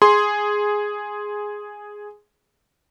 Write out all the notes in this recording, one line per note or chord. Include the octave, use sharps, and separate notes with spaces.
G#4 C6